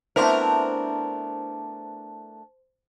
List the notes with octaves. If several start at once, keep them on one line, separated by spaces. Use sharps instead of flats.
A3 B3 C4 D4 E4 A#4 C5 C6